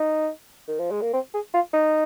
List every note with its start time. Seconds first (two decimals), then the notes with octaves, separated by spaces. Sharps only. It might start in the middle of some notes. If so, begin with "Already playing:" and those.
Already playing: D#4
0.68 D#3
0.79 F3
0.91 G#3
1.02 A#3
1.13 C4
1.34 G#4
1.54 F4
1.73 D#4